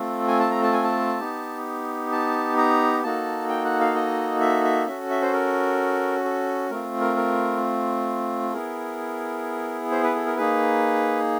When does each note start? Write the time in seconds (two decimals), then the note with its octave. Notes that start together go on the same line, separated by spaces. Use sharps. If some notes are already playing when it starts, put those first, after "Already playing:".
Already playing: A3 C4 F4 A4
0.28 G#5
0.40 A5
0.51 A#5
0.63 A5
0.73 G#5
0.84 A5
1.20 B3 D#4 G4
2.12 A5
2.57 A#5
3.03 A#3 D#4 F#4 A4 A5
3.49 G5
3.65 F#5
3.80 F5
3.95 D#5
4.41 E5
4.64 E5
4.87 C#4 F#4 A4 E5
5.10 E5
5.22 C5
5.33 A#4
6.25 A4
6.70 A3 C4 F4 A#4
7.00 A#4
7.16 A#4
8.50 A4
8.53 B3 E4 G#4 A#4
9.91 C5
10.03 B4
10.15 A4
10.26 A#4
10.37 A#3 D#4 G#4 B4